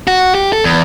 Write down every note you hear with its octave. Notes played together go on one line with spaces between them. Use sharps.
F#4
G4
A4
E2